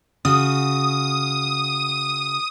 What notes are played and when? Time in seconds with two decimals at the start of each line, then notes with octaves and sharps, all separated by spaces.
0.25 C#3 F#4 D#6